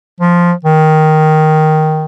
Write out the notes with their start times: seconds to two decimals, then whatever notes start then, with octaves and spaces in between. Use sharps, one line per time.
0.20 F3
0.65 D#3